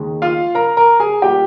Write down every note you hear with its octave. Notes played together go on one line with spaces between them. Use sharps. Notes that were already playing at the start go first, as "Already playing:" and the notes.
Already playing: D#2 D#3 G#3
F4 F5
A#4 A#5
A#4 A#5
G#4 G#5
A#2 G3 G4 G5